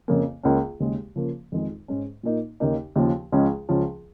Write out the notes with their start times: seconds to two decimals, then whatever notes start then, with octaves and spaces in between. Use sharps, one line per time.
0.08 F2 C#3 A#3
0.43 C#2 C#3 A#3 C#4 F4
0.80 D#2 C#3 G#3
1.16 C#3 F3 A#3
1.52 F2 D#3 G#3 D#4
1.88 G#2 G#3 C#4
2.23 A#2 A#3 D#4
2.60 D#2 C#3 A#3 D#4
2.96 D#2 C#3 F3
3.32 C#2 C#3 F3 G#3 C#4
3.69 C#2 C#3 F3 C#4